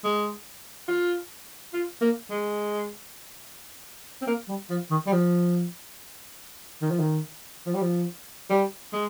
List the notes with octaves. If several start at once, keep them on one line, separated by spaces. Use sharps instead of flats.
G#3
F4
F4
A#3
G#3
C4
A#3
G3
F3
D#3
G3
F3
D#3
F3
D#3
F3
G3
F3
G3
G#3